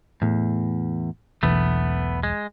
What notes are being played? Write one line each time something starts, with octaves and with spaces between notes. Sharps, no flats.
E2 A2
E1 B1 E3 A3 B3
G#3